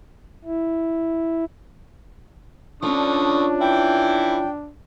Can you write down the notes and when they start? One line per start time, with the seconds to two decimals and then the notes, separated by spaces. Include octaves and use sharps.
0.45 E4
2.83 D3 F3 C#4 D4 C#6 D#6
3.61 E3 E4 G5